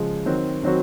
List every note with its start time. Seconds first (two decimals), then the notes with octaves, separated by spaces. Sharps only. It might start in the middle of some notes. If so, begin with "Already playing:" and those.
Already playing: C#3 F3 G#3
0.26 D#3 F#3 C4 F#4
0.63 D#3 F#3 C4 F#4